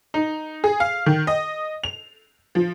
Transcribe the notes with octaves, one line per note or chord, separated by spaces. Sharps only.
D#4
G#4
F5
D#3
D#5
F7
F3